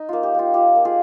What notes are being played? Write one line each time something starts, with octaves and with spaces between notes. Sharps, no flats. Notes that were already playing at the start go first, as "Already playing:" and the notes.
Already playing: D#4
A#3 F4
G4
A#3 F4
F4 G4
A#3
F4 G#4